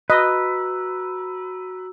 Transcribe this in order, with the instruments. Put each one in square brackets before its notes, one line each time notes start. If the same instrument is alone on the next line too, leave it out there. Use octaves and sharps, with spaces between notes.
[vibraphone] F#4 A#5 E6 [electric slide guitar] B4 [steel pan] D#5